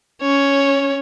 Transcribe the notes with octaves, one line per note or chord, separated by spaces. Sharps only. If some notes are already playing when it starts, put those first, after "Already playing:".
C#4 C#5